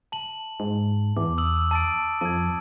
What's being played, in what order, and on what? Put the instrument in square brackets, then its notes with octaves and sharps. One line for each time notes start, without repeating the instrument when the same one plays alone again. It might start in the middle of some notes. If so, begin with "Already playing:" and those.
[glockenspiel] A5 F#7
[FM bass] G#2
[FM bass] E2 [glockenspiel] D6
[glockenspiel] D#6 E6 F#7
A5 A6 D7
[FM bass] F2 [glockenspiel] A5 G#6